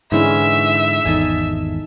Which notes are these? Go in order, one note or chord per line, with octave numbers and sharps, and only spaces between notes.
G#2 D3 E3 G#3 C#4 E5
G#1 E2 D#4 A4 G#5